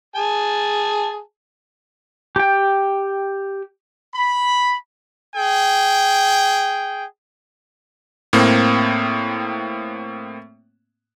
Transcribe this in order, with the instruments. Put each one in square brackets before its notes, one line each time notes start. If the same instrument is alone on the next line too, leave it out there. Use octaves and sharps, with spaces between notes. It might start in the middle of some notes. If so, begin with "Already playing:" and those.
[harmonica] G#4 G#5 A5
[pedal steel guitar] G4 G5
[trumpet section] B5
G#4 G5
[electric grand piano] A2 A#3 C4